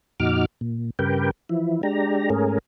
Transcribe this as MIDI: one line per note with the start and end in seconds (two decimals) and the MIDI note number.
0.20 0.46 41
0.20 0.46 46
0.20 0.46 63
0.20 0.46 66
0.20 0.46 86
0.20 0.46 89
0.61 0.90 46
0.99 1.31 43
0.99 1.31 49
0.99 1.31 67
0.99 1.31 70
0.99 1.31 71
0.99 1.31 79
1.49 1.82 52
1.49 1.82 53
1.49 1.82 64
1.83 2.29 56
1.83 2.29 62
1.83 2.29 67
1.83 2.29 82
2.30 2.58 44
2.30 2.58 57
2.30 2.58 61
2.30 2.58 68
2.30 2.58 70